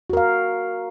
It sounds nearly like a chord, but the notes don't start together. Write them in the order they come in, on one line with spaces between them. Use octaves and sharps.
F#4 A#4 F5